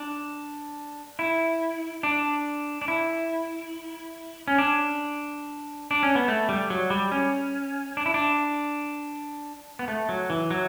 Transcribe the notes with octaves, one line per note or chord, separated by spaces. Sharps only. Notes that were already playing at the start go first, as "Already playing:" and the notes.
Already playing: D4
E4
D4
D4
E4
C#4
D4
D4
C#4
B3
A3
G3
F#3
G3
C#4
D4
E4
D4
B3
A3
F#3
E3
F#3